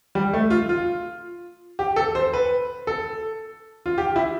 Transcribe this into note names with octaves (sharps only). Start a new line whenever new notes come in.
G3
A3
F4
F4
G4
A4
C5
B4
A4
F4
G4
E4